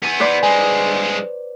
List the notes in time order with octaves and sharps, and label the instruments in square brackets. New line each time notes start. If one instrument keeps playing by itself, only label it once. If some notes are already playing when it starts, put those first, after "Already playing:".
[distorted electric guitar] B3 G#5
[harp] B4 C5 D5
[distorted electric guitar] G2 G#3 [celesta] G#5